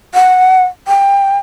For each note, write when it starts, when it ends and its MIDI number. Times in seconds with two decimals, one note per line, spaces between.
0.14 0.63 78
0.87 1.38 79